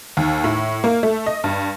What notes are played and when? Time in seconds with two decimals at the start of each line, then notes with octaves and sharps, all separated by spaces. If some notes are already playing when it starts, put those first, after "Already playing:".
0.17 D#2
0.44 A2
0.84 A#3
1.03 A3
1.26 D#5
1.44 G2